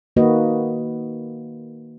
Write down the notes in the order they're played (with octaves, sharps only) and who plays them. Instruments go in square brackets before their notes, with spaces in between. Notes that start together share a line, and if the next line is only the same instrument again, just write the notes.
[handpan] D#3 A#3 F#4 B4 D#5